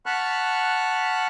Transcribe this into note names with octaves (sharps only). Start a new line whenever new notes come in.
F#5 A5 B5 C#6 F6 F#6